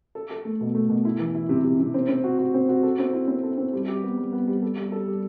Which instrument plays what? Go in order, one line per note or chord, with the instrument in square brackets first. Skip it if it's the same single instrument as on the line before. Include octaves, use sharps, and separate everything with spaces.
[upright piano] A4
A4
A3
B2
A3
B2
E4
E3
E4
C3
C3
C3
C4
C4
F#4
F#4
C4
F#4
A4
C4
E4
C4
A4
C4
G3
G4
B3
G3
B3
G3
A4
G3
A4
G3